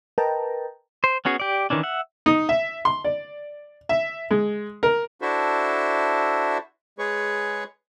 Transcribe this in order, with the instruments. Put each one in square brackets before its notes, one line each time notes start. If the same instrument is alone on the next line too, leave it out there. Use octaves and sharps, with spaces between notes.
[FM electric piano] A#4 B4 D#5 G5 A5 A#5
[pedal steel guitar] C5
B3 C#4 F#4 G#4
G4 D5
D#3 E3 C#4 D4
E5 F#5
[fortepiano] D#4
E5
C6
D5
E5
G#3
A#4
[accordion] D4 E4 F#4 A4 C5 E5
G#3 G#4 B4 C#5 C#6